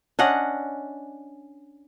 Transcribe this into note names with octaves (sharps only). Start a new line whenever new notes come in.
C#4 D4 D#5 F#5